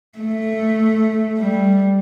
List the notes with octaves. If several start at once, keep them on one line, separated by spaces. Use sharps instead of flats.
A3
G3